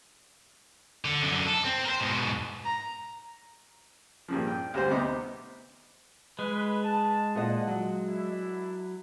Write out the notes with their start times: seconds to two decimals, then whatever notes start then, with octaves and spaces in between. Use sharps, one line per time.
1.05 D3
1.22 F#2 D3
1.47 A4
1.65 C4
1.85 A#4 C5
2.00 G#2 B2
2.64 A#5
4.28 G2 A#2 C#3 F3
4.48 G5
4.74 D2 G3 C5
4.91 C3 B3 D#4 D6
6.39 G#3 B4
6.84 A5
7.35 A#2 D#5 F#5
7.67 F#3
8.08 F#2 D4 E4